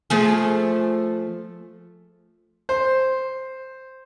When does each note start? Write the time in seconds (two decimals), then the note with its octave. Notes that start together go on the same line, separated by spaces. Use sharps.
0.10 F3 A3 G#4
2.69 C5